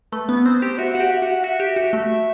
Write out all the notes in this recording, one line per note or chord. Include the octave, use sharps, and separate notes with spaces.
A3 B4
B3
C4 C5
G4
F#4 E5
F#4 F#5
G4
E5
F#4
F#5
F#4 E5
G4
F#4
A3